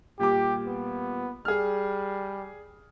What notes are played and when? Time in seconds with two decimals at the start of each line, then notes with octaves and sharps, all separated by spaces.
0.19 A#2 G3 G4 D6
0.66 B3
1.45 G3 G#4 F6